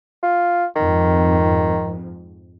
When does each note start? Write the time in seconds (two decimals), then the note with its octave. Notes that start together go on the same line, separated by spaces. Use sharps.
0.23 F4
0.76 F2 G#2 D#3